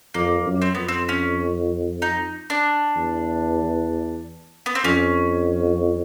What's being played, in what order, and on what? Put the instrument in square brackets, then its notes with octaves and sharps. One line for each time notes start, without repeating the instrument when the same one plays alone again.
[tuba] F2 [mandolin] A#3
[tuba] F#2
[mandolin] C4
[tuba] F2 [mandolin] B3
[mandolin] C4
C#4
D#4
D4
[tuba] E2
[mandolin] B3
C4
[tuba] F2 [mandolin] C#4